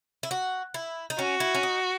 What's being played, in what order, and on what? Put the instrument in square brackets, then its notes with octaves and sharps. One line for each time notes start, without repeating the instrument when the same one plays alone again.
[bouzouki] E4
F#4
E4
D#4
[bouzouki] C#4 [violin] F#4
[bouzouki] E4
C#4
D#4